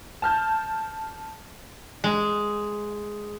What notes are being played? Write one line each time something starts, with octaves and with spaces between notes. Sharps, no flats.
A5 F6 G6
G#3